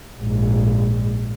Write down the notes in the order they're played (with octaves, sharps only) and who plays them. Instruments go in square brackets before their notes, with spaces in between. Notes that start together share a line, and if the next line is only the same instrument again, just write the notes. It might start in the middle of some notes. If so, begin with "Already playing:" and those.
[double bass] A#1 G#2